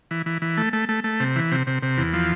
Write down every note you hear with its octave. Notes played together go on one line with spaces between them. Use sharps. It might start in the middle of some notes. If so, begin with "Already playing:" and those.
E3
E3
E3
A3
A3
A3
A3
C3
E3
C3
C3
C3
E2
F3